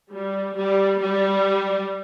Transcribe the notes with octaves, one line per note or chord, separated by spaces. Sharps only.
G3
G3
G3